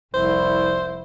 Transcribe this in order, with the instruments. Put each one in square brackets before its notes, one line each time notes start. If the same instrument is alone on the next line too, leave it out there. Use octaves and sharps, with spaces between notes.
[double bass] F1 E4 [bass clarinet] C2 [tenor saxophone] C5